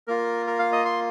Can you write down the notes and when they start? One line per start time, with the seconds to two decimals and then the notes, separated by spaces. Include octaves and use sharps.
0.08 A#3 F4 A#4
0.47 A#4
0.59 F5
0.72 D#5
0.85 C6